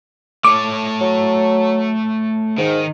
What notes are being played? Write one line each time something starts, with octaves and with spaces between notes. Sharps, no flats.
A3 C#5 D6
F#3
G#2 D#3